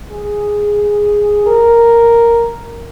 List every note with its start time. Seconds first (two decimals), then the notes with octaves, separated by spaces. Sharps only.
0.11 G#4
1.46 A#4